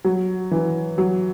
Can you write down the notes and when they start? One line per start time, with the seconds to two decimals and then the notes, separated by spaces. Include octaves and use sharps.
0.05 F#3
0.51 E3
0.98 F#3